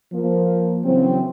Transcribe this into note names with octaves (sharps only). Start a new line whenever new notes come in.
F3 A#3
C#3 E3 F#3 C4